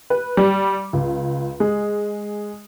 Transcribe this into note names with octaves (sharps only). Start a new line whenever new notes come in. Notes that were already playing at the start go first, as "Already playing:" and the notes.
B4
G3
C#2
G#3